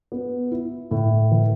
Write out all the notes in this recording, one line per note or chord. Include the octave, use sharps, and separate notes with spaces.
B3
E4
A2
E3